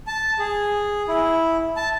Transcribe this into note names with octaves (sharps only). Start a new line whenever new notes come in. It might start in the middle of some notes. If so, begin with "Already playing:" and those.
A5
G#4
E4
A5